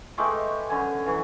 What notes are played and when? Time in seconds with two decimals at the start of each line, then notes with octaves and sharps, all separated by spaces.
0.18 G#3 A3 G4 B4
0.69 F#2 D3 G#5
1.06 E3 F#3